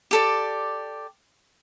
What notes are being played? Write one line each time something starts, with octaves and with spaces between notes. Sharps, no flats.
G4 A4 D5